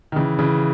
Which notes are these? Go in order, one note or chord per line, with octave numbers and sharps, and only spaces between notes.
D#3
C#3 E3
C#3 E3